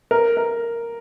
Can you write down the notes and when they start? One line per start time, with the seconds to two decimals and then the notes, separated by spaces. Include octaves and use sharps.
0.11 A#4
0.37 A#4